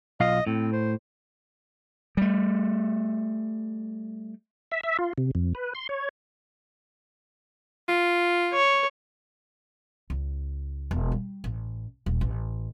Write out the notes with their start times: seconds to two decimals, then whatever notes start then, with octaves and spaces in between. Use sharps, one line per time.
0.20 B1 F4 D#5 F5
0.47 A2 C4
0.72 C5
2.17 G3 A3
4.72 E5
4.83 E5
4.99 F4
5.18 C3
5.35 F2
5.55 B4
5.75 C6
5.89 C#5
7.88 F4
8.53 C#5
10.10 C#2
10.91 E1
11.12 G3
11.44 A1
12.06 D#1
12.21 A1